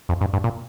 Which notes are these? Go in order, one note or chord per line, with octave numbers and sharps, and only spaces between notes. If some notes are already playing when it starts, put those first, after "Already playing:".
F2
G2
G2
A#2